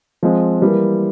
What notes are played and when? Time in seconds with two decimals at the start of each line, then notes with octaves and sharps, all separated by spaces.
0.23 F3 G#3 C4
0.61 E3 G3 A#3